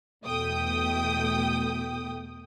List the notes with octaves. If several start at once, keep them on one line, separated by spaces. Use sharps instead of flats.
E2 B2 A3 G5 D#6